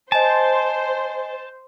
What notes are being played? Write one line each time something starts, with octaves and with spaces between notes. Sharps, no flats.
C5 D#5 G#5 A5